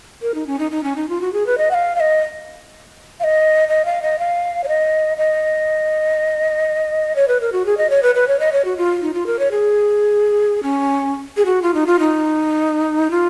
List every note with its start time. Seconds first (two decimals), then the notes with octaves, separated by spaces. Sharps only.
0.22 A#4
0.35 D#4
0.47 C#4
0.59 D#4
0.71 D#4
0.84 C#4
0.96 D#4
1.09 F4
1.21 F#4
1.33 G#4
1.47 B4
1.58 D#5
1.71 F#5
1.74 F5
1.96 F5
2.00 D#5
3.20 F5
3.24 D#5
3.69 D#5
3.85 F5
4.02 D#5
4.19 F5
4.64 C#5
4.68 D#5
5.18 D#5
7.16 C#5
7.28 B4
7.41 A#4
7.53 F#4
7.66 G#4
7.78 D#5
7.90 C#5
8.03 B4
8.15 B4
8.28 C#5
8.40 D#5
8.53 C#5
8.65 F#4
8.77 F4
9.02 D#4
9.14 F4
9.27 A#4
9.39 C#5
9.51 G#4
10.63 C#4
11.37 G#4
11.45 F#4
11.62 F4
11.74 D#4
11.87 F4
11.99 D#4
13.11 F4